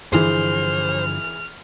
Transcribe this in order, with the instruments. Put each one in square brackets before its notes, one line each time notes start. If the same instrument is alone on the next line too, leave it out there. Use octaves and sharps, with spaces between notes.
[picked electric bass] G2 D3 F3 [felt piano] E3 G#4 [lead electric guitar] C5 [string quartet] F6